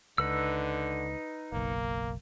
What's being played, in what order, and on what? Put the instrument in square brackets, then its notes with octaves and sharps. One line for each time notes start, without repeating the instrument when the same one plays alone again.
[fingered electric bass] C#2 [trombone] D3 [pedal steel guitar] D#4 B4 E6
[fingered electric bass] F#1 B1 [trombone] A#3